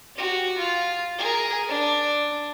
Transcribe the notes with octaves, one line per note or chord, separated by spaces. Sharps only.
F#4 G4
F4
G#4 A#4
D4